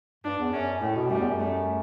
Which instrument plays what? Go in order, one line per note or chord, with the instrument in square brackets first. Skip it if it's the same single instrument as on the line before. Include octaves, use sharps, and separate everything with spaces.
[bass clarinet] G2 [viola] D4
[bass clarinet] E2
[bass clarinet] F#2 [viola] C#4
[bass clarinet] A2 [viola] A3
[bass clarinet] B2
[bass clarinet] F#2 [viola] G3
[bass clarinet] E2
F#2
[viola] A3